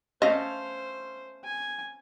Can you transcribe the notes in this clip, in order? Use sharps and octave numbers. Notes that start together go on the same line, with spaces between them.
A3 C#4 C5 D#5 F5
G#5